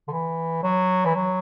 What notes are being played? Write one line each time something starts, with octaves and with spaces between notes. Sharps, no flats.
D3
E3
F#3
E3
F#3